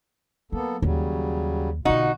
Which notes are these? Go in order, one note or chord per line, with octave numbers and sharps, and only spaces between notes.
F#3 A#3 B3 A4
D#2 C#3 F#3 G3
B1 D3 D#4 F4 F#4